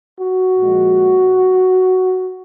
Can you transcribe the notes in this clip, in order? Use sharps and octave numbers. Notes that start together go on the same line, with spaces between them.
F#4
A#2 F3 G#3